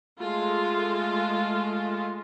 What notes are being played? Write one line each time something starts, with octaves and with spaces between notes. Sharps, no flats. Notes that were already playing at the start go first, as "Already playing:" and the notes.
G#3 A3 F4